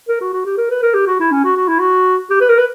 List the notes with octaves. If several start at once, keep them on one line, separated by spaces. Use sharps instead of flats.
A#4
F#4
F#4
G4
A#4
B4
A#4
G4
F#4
E4
C#4
F#4
F#4
E4
F#4
G4
B4
A#4
B4